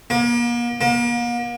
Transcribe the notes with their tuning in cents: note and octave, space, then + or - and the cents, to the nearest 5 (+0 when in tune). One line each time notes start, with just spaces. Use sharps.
A#3 +40
A#3 +40